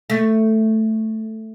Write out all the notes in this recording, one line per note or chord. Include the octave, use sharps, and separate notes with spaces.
A3